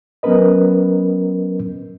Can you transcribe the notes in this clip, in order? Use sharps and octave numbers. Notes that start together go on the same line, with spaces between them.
F#3 B3 C#4 A#4 B4 D#5